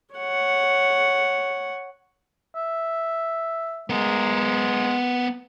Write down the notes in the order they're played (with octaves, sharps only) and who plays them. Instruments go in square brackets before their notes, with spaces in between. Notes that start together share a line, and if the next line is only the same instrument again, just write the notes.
[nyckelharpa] C#5 F#5
[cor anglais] E5
[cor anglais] G#3 [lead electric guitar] B3 A#4